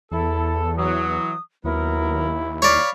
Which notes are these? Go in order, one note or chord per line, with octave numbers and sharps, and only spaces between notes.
E2 E4 A4
E3 F#3 D#6
D#2 F#3 B3 E4 A#4
C#5 D5 F5 B5